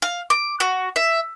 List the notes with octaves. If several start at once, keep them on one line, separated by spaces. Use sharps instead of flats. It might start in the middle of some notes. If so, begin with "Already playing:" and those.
F5
D6
F#4
E5